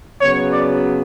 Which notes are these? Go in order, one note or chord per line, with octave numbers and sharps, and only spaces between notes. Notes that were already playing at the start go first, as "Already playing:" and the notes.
C#3 F#3 B3 C#5
D5